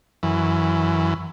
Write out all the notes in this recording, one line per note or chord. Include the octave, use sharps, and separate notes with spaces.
F#2 E3